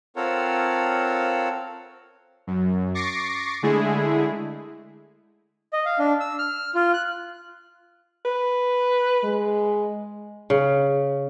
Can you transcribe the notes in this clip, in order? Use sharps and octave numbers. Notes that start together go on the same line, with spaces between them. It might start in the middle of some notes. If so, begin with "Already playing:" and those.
C4 F4 A4 A#4 C#5 F#5
F#2
C#6 D6 A6 A#6 C7 D7
D3 G#3 A3 E4 G#4
D#5
F5
D4
E6
F6
F4
F#6
B4
G#3
C#3